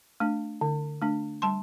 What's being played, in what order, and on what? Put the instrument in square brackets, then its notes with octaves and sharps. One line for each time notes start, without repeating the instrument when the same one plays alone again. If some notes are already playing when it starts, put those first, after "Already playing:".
[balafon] A3 D4
D3
A3 D4
G3 A5 C6